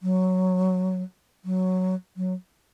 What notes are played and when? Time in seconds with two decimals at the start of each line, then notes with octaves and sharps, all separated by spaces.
0.02 F#3
1.45 F#3
2.17 F#3